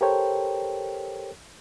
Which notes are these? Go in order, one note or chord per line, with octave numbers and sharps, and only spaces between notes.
G4 A4 A#4 C5 C#5 G5